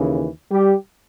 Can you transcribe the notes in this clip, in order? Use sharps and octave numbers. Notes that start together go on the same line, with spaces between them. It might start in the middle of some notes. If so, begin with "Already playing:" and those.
Already playing: D#2 C#3 E3
G3 G4